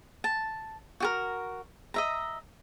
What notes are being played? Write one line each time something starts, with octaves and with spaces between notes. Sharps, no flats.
A5
F#4 G4 A#4
D#5 E5 A#5